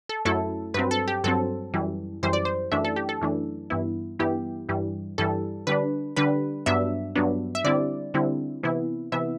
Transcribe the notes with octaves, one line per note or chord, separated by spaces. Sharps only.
A4
F#2 F#3 A3 E4 A4
G2 F#3 C4 B4
A4
G4
G2 F#3 C4 A4
F#2 E3 G3
F#2 E3 G3 C5
D5
C5
F#2 E3 A3 D4 E5
A4
G4
A4
F#2 E3 A3 D4
G2 E3 B3 E4
G2 E3 B3 E4 G4
G2 E3 G3
G2 E3 G3 A4
D3 G3 D4 B4
D3 G3 D4 B4
G2 F#3 B3 D4 E5
G2 F#3 B3 D4
E5
D3 G3 C4 E4 D5
D3 G3 C4 E4
C3 E3 B3 E4
C3 E3 B3 E4 E5